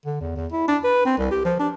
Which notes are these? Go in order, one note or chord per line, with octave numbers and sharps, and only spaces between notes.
D3
E2
E2
E4
D4
B4
C4
C2
G4
F3
D4